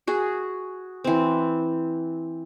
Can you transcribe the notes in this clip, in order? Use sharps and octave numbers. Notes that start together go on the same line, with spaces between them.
F#4 G#4
E3 C4